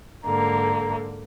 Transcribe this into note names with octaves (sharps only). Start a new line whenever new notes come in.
G#2 D3 A#3 A#5